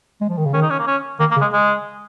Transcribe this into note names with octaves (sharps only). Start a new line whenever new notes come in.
G#3
F3
D#3
C#3
D#3 C#4
D#4
C#4
A#3
C#4
D#3 A#3
A#3
C#3
G#3
G#3